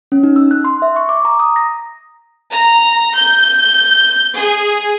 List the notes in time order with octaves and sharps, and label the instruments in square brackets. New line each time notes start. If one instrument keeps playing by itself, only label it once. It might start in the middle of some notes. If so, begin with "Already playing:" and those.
[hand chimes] C#4
D#4
E6
F#6
C6
E5
C#6
D6
A#5
D#6
A#6
[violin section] A#5
G6
G#4